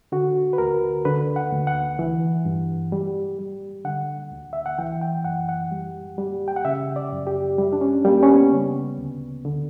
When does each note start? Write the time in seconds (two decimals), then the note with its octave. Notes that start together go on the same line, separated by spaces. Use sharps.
0.12 D3 F#4
0.53 B4
0.58 D2 A#4
1.05 D3 B4
1.36 F#5
1.52 D2
1.67 F#5
1.99 E3
2.45 G2
2.92 G3
3.39 G3
3.85 D3 F#5
4.32 D2
4.53 E5
4.66 F#5
4.78 E3 G5
5.02 G5
5.25 F#2 F#5
5.49 F#5
5.72 G3
6.18 G3
6.48 G5
6.56 F#5
6.65 C#3 E5
6.96 D5
7.12 F#2
7.27 G4
7.58 G3
7.73 D4
7.81 C#4
8.05 G3 A#3
8.23 C#4
8.29 B3
8.52 C#3
8.98 D2
9.45 D3